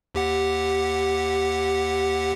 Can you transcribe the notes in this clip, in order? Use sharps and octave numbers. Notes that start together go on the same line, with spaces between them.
D#2 G4 F#5